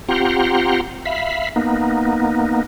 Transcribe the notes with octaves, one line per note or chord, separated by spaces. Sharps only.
C4 F4 G4 F#5 A#5 C6
E5 F5 B5
A#3 B3 D#4